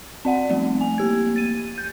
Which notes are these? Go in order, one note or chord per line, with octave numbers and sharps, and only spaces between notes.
C4 D5 F#5
F3 G3 A3 C4
A3 G#5
A#3 G4 G#6
A6 D#7
G6